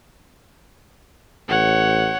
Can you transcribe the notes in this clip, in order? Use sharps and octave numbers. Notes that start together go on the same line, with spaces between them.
A1 C#5 F#5